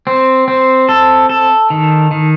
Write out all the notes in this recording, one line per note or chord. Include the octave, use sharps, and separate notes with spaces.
C4
C4
A4
A4
D#3
D#3